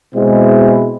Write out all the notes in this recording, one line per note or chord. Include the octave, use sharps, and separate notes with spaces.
B2 G#3 C4 E4